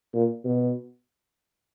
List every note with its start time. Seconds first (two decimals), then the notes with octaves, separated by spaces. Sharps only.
0.14 A#2
0.45 B2